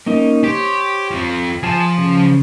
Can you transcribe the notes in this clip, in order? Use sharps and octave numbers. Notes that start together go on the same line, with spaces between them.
A#3 C#4 D#4
G4 C5 C#5
F3 C4
F3 G#4 G#5 A5
C#3